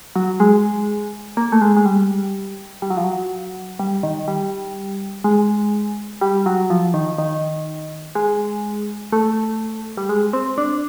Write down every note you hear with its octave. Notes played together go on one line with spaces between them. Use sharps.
F#3
G#3
A#3
A3
G#3
G#3
G3
G3
F#3
F3
F#3
G3
D#3
G3
G#3
G3
F#3
F3
D#3
D#3
G#3
A3
G3
G#3
C4
D4